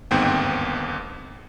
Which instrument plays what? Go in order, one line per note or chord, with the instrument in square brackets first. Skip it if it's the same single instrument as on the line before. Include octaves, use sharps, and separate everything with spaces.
[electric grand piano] G1 D#2 G#2 B3 C4 G5